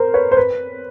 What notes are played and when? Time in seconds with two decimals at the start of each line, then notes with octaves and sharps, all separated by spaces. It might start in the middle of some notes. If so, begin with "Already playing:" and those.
Already playing: A#4 C5
0.14 B4 C#5
0.32 C5
0.37 B4